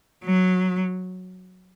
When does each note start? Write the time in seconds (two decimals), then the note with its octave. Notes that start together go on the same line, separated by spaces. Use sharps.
0.25 F#3